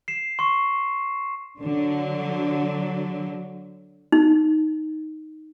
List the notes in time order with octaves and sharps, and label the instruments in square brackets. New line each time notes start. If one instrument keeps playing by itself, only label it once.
[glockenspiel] C7 E7
C6 C#6
[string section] D3 F#3
[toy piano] D#4